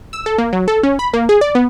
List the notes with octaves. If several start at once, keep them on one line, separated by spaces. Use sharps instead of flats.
E6
A4
A#3
F#3
A4
C#4
B5
A#3
G#4
D5
B3